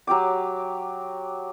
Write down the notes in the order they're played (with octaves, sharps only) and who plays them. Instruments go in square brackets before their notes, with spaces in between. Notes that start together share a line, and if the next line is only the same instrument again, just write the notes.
[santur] F#3 G4 G5 D6